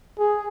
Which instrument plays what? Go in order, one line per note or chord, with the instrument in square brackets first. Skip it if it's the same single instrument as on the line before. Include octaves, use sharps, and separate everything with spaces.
[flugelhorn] G#4